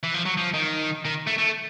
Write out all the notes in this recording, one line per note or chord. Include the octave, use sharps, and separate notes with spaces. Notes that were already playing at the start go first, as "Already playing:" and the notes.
E3
F3
F#3
F3
D#3
D#3
A3
A3